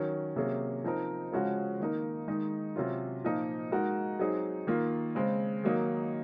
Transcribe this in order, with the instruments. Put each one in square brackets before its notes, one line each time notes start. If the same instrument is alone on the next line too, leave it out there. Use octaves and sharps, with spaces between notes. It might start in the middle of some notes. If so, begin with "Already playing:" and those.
Already playing: [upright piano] D#3 F#3 C#4
C3 F#3 A#3 C#4 G#4
F3 C4 D#4 A#4
C#3 F3 G#3 C#4 F#4
D#3 A#3 D#4 A#4
D#3 G#3 D#4
C3 F#3 C#4 F4
A#2 F3 A#3 D#4 A#4
G#3 D#4 F#4 A#4
F#3 C4 D#4 G#4
D#3 A#3 F4
C#3 G#3 C4
D#3 F#3 A#3 D#4